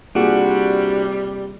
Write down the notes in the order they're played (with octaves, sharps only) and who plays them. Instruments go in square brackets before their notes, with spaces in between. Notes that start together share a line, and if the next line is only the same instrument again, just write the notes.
[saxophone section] C3 G3 [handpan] A#3 F4 G#4 [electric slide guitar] D4 F#4